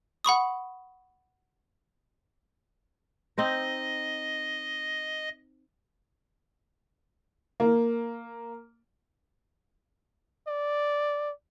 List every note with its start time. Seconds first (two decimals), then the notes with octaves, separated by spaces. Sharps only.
0.25 F#5 B5 C#6 D#6
3.38 C4 D#4 C5 D#5
7.60 A#3
10.48 D5